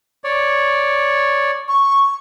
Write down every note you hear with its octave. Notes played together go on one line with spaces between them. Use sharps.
C#5 D5
C#6